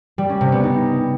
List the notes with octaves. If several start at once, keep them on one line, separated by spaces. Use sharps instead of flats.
G3
C#4
C3
B3
D#4